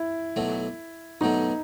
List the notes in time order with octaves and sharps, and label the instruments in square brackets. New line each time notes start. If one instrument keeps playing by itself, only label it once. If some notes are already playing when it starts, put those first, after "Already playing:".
Already playing: [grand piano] E4
[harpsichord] B1 B2 F#3 A3
[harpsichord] B1 B2 F#3 A3 [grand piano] D#4